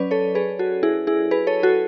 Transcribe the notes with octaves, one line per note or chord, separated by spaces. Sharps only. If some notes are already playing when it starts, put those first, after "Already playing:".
Already playing: F#3 C#4 B4 D5
A4 C#5
G#4 B4
F#4 A4
E4 G#4
E4 G#4
G#4 B4
A4 C#5
F#4 A4